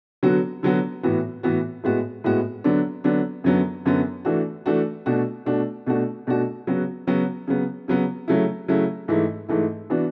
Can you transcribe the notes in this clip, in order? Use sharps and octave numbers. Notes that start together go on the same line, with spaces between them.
D3 F#3 B3 F#4
D3 F#3 B3 F#4
A2 E3 B3 F#4
A2 E3 B3 F#4
A2 G#3 B3 F#4
A2 G#3 B3 F#4
D3 F#3 B3 D4
D3 F#3 B3 D4
F#2 D3 F#3 B3
F#2 D3 F#3 B3
E3 A3 D4 F#4
E3 A3 D4 F#4
B2 A3 D4 F#4
B2 A3 D4 F#4
B2 A3 D4 F#4
B2 A3 D4 F#4
C#3 F#3 B3 F#4
C#3 F#3 B3 F#4
C#3 F#3 B3
C#3 F#3 B3
C#3 F#3 A3 E4
C#3 F#3 A3 E4
G#2 E3 A3 E4
G#2 E3 A3 E4
E3 B3 D4 F#4